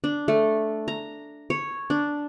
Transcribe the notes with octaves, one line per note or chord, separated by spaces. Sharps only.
D4
A3
A#5
C#5
D4